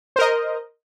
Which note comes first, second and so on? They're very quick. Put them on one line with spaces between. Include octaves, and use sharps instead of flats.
C5 A#4 D#5